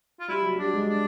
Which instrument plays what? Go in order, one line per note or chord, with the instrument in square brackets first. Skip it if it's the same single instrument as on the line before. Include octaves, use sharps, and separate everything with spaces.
[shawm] F4
[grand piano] G3 [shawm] E4
[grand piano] F#3
[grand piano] G3 [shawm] D4
[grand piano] G#3
[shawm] D4